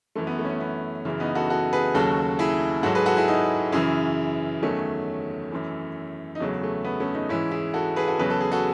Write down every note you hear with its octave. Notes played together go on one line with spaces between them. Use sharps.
F#2 E3 A3
B3
A3
C#4
B3
B3
F#2 C#3 E3
B3 D#4
F#4 A4
F#4 A4
G#4 B4
D#2 C#3 F#3 F#4 A4
E4 G#4
G#2 F#3 F#4 A4
G#4 B4
F#4 A4
E4 G#4
D#4 F#4
F#2 C#3 E3 E4 G#4
E2 D#3 F#3 A3 C#4
F#2 E3
D#4
E2 C#3 F#3 A3 C#4
A3
B3
A3 C#4
B3 D#4
G#2 E3 C#4 E4
E4 G#4
F#4 A4
G#4 B4
F#4 A4
E2 C#3 F#3 B4
A4
G#4
F#4 A4